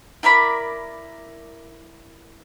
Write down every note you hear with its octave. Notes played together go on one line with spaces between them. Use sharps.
E4 A#4 D5 B5